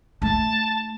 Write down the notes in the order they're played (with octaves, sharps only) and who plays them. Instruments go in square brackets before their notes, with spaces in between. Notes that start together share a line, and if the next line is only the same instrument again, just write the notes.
[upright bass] A3 D#4 [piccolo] A5